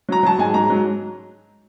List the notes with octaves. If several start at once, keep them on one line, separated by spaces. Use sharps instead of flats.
F#3 A#5
F#3 A5
G#2 G#5
G#2 A#5
F#3